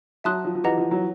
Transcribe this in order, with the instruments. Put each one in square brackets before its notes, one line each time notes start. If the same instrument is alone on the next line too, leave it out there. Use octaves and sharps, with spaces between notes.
[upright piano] F#3 [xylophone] E5 A5 C6 D#6 F#6
[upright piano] F3
F3
[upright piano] E3 [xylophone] G4 B4 D#5 F#5 A#5
[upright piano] F3
F#3